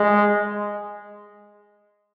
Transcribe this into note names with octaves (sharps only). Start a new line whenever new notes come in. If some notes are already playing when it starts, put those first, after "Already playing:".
Already playing: G#3